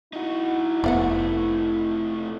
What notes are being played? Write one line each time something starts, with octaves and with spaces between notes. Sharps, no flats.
D#4 E4 F#4
F1 C3 A3 B3 D5 F5 F#5